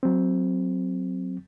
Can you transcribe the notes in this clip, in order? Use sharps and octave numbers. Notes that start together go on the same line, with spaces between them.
F#3 C4